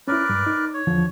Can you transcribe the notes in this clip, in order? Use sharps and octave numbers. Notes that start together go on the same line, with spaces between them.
C#4 E4 A#4 B4 D5
G2
D#4
C#5
E2 D3 F3